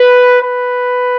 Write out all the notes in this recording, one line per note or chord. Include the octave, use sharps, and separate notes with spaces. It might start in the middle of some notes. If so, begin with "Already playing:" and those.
Already playing: B4
B4